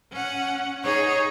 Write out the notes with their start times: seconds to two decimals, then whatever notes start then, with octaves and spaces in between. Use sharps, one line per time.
0.12 C#4 F#5
0.84 D#4 G#4 C#5